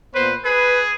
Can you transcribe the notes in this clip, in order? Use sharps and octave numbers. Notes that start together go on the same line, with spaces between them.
A#2 B3 B4 C5
G#4 B4